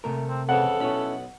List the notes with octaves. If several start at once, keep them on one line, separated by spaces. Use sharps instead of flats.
C3 A3 A#4
C4
F2 C#3 E3 A4 F#5
B1 C#4 E4 C#5 B5